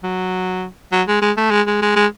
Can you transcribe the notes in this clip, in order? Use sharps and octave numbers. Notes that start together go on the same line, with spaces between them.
F#3
F#3
G#3
G#3
A3
G#3
G#3
G#3
G#3